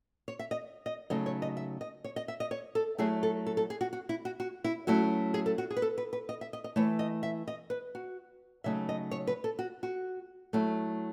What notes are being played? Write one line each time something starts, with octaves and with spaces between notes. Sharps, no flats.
C#5
E5
D#5
D#5
C#3 F#3 A3 D#4 D#5
C#5
D#5
E5
D#5
C#5
D#5
E5
D#5
C#5
A4
F#3 A3 E4 G#4
A4
A4
A4
G#4
F#4
F#4
E4
F#4
F#4
E4
F#3 A3 C#4 E4 F#4
G#4
A4
F#4
G#4
B4
A4
B4
B4
D#5
E5
D#5
D#5
E3 A3 E4 C#5
D#5
E5
D#5
B4
F#4
C#3 F#3 A3 D#4 E5
D#5
C#5
B4
A4
F#4
F#4
F#3 A3 E4